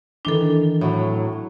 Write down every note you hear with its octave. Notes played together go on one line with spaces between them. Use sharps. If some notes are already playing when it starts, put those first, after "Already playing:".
D#3 E3 D4 A4 G7
A2 F#3 E5